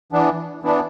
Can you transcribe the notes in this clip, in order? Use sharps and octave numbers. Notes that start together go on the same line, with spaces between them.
E3 B3 D4
E3 B3 D4